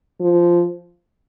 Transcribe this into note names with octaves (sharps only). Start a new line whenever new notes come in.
F3